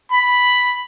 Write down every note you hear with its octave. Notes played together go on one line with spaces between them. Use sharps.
B5